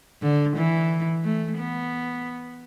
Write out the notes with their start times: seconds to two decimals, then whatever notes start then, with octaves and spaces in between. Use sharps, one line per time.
0.22 D3
0.56 E3
1.24 A3
1.58 B3